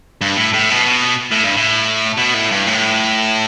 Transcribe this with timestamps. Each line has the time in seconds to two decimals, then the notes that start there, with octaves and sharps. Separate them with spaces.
0.21 G2
0.37 A2
0.54 A2
0.70 B2
1.31 A2
1.43 G2
1.56 A2
2.17 B2
2.34 A2
2.51 G2
2.66 A2